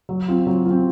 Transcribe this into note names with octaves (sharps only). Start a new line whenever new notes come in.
F#3
C4 F4
F#3
C4 F4